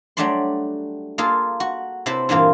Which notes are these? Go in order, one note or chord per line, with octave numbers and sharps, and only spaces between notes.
F#3 G3 A3 D4 D5 C6
A#3 F4 G#4 A4
F#4
C3 E4 B4 C5 A5
G2 A#2 E3 A#3 F4